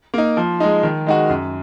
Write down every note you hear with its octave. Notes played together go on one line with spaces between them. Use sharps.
A#3 D#4
F3
G#3 D#4
D#3
G#3 D#4 F#4
F#2